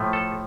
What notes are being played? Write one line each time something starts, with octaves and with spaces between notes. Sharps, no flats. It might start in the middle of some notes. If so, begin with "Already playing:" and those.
Already playing: A2 F3 A3
A4